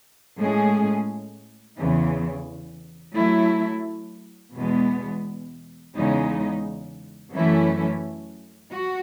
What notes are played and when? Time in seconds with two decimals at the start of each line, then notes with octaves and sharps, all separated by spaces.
0.39 A2 G#3 C#4 G#4
1.77 E2 C#3 E3
3.17 F#3 A3 E4
4.55 E2 B2 G#3 B3
5.95 E2 C#3 G#3 D#4
7.33 F#2 E3 A3 C#4 E4
8.72 F#4